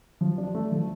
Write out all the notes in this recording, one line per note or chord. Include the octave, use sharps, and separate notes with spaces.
F3
D4
A3
F3